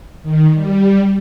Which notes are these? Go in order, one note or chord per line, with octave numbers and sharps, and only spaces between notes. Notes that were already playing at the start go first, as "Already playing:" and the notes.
D#3
G3